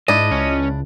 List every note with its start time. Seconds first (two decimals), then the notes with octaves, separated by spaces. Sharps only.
0.08 G#2 D4 E4 D#5
0.31 C#2 C#4